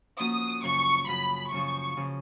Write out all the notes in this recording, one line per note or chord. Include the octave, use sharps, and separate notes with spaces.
F3 A#3 C#4 F#4 D#6
F#2 C#3 F3 C#6
F#2 C#3 F3 B5
F#2 C#3 F3 C#6
C#3 F3